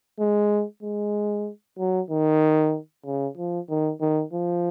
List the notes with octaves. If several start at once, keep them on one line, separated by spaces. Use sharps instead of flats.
G#3
G#3
F#3
D#3
C#3
F3
D#3
D#3
F3